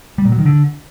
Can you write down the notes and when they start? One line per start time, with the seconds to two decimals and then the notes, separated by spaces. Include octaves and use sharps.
0.18 G3
0.25 A#2
0.32 F#3
0.39 D#3
0.46 D3